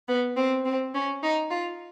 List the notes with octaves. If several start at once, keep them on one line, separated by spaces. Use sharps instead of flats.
B3
C4
C4
C#4
D#4
F4